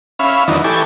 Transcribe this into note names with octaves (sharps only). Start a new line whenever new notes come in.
C#4 E5 F5 B5
E2 D#3 E3 F#3 D4 D#4
E3 G4 A4 G#5 C#6 D6